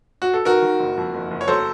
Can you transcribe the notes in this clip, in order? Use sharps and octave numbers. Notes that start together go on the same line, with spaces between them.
F#4
A4
D#3 F#4 A#4
D#3
F#1
F2
F#1
F#1
C#5
F#3 A4 C5